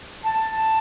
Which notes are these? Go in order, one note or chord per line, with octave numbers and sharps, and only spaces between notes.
A5